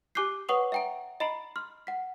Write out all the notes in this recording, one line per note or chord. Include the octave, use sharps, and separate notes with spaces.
G4 G#5 D6 F#6 G6 C7
B4 C#5 F#5 C#6 D#6 F7
E5 F#5 G5 A#5 D7
D#5 A#5 B5 C7 D7 F#7
C6 F6
F#5 B6